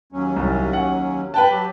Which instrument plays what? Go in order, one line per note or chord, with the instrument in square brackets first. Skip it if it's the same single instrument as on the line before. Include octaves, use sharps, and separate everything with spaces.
[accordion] D#2 F#3 C#4
[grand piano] C2
F#5
[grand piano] B4 G5 A5 [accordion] F#6
[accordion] F#3 G4